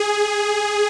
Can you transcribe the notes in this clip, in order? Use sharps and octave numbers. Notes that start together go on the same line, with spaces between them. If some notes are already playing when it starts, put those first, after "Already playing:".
Already playing: G#4